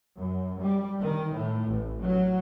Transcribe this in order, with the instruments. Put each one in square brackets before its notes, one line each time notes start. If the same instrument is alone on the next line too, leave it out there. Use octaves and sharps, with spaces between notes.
[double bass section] F#2
G3
D#3
A2
A1
F#3